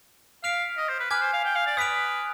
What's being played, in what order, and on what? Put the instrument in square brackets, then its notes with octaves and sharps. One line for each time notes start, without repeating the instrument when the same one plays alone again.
[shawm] F5 [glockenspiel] F6 B6 D7 F7
[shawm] D#5
C5
B4
[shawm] B4 [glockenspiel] G#5 D6 F6 G#6
[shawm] C5
F5
G5
F5
D5
[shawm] B4 [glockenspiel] D#6 B6 D7 F7